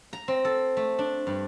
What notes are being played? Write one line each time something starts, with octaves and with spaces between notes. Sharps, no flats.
A#5
C4
A4
A3
D4
G2